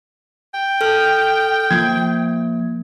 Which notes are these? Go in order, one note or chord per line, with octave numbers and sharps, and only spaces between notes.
G5
A4 F6
F3 A#3 G#6